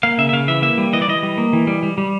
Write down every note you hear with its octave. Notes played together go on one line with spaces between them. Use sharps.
A#3 F5
C#3 E5
E5
C#3 F5
E3 E5
A#3 E5
G3
E3 D#5
D5
E3 D#5
G3
A#3
E3
G3
G3
G3